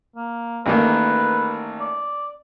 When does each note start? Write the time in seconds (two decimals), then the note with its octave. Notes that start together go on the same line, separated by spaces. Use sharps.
0.16 A#3
0.66 A1 D#3 A#3 B4
1.81 D5